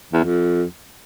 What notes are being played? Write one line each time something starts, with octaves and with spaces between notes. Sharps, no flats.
E2
F2